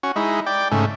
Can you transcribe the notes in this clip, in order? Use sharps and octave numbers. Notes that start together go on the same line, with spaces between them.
C#4 F#4
G#3 D#4 E4
D5 G5
G#2 C#3 A3